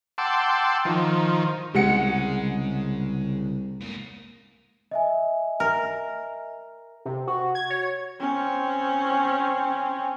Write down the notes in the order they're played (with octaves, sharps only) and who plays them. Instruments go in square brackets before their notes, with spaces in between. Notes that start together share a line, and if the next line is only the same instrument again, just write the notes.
[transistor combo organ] F#5 G5 A5 C6 D6 E6
D#3 F3
[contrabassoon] C2 [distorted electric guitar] C#3 [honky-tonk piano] G#3 F#5 C#7
[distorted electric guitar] G#2 A#3
[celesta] D#5 E5 G#5
[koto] A#4
[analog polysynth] C3
F#4
G#6
C#5
[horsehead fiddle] C4 C#4